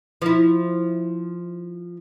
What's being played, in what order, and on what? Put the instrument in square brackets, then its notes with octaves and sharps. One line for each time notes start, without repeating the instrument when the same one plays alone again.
[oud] F3 E4